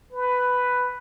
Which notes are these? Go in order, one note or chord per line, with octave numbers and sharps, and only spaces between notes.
B4